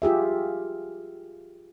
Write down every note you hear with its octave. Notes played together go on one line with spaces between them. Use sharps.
F4 G4 G#4 E5